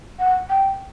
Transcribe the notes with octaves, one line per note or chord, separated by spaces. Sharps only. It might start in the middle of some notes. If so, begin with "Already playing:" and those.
F#5
G5